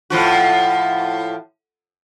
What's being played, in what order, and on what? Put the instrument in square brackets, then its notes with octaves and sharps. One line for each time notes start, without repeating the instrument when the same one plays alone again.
[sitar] A2 F3 F#4